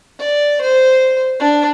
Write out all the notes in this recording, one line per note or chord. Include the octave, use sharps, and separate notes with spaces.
D5
C5
D4